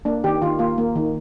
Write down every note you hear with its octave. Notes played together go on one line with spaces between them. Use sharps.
A#3 D4
D#3 G4
D#3 F4
A#3 F4
A#3
D#3